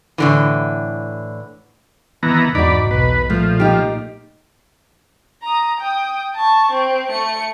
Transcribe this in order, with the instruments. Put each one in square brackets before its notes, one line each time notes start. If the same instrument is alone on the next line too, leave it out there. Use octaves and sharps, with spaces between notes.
[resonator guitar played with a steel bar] A2 D3 E3
[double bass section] D#3 [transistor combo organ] E3 B3 A#5
[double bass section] E2 G#2 [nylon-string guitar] D#4 F#4 [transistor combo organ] D5 B5
[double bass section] B1 E2 [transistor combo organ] B4
[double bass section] A#2 [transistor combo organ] F3 [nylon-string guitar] A3
[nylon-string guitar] D#4 G4
[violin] A#5 D#6
G5 D#6
A5 C#6
C4
A3 C#7